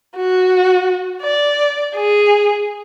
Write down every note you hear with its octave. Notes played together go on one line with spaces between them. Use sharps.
F#4
D5
G#4